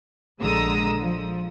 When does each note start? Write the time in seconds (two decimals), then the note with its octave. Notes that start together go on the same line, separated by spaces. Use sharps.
0.40 A#1 D3 G#3 A#5 D#6 E6
1.02 F3